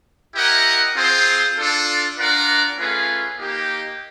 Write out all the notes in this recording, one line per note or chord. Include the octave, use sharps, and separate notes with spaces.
E4 G4 A#4 D#5 F#5
C4 F4 G#4 C5
D4 F4 A4
D4 F4 A#4 D5 F#5
A3 C#4 F4 G#4 B4
A#3 D#4 G4